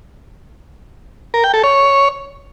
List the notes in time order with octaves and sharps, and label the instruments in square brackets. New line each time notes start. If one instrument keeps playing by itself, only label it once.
[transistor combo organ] A#4
G5
A4
C#5